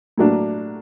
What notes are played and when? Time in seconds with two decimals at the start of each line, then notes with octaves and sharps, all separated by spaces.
0.18 A2 F#3 A#3 D4